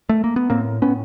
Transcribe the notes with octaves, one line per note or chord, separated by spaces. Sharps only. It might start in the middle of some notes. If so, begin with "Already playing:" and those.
A3
A#3
B3
A2 A#3 C4
A2 B3 C#4